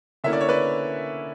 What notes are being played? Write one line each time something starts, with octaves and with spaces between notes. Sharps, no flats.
D3 A#3 C#4 E4 E5
D5
C#5
B4 D5